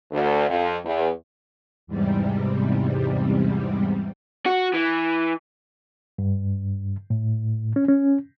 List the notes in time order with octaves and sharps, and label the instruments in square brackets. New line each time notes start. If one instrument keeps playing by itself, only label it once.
[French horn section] D2
F2
E2
[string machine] E2 G#2 C3 G3
[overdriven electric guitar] F#4
E3
[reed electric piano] G2
A2
C#4
C#4